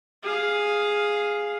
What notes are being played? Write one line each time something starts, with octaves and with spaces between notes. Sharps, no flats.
G#4 F5